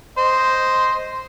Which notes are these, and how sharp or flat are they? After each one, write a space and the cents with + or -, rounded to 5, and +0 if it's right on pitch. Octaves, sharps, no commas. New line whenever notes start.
C5 -5 D#5 +0